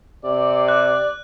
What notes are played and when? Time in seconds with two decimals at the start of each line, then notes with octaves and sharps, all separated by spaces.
0.24 C3 D5
0.68 F#6